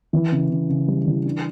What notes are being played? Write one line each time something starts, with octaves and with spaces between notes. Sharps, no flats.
E3
C#3
C#3
C#3
G3
E3
D4